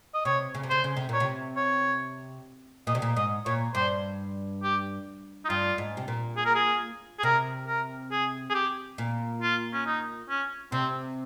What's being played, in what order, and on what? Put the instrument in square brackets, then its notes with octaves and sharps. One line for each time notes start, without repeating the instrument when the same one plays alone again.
[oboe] D#5
[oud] C3 [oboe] C#5
[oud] C#3
C3
[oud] C#3 [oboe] C5
[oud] C#3
C3
[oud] A#2 [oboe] C#5
[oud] C3
[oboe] C#5
[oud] A#2 [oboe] D#5
[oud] C3
A#2
[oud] G#2 [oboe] D#5
[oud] A#2 [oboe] C#5
[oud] G2 [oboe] C5
[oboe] G4
D#4
[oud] G2 [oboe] F4
[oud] G#2
C3
A#2
[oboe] G#4
A#4
G#4
G#4
[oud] C3 [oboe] A#4
[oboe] A#4
G#4
G#4
G4
[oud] A#2
[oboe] F4
C#4
D#4
C#4
[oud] C3 [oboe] C4